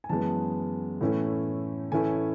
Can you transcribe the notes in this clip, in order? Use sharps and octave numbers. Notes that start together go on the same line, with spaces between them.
G#5
F#2 E3 G#3 B3 A5
A2 E3 A3 C#4 E4
A2 E3 A3 C#4 E4 G#5